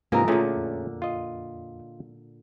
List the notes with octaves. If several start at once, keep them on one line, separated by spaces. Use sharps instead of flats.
G#2 C3 E3 A#3 F4 A#4 D#5 A#5
A#2 D3 A3 C#4 G#4
F2
F4 D#5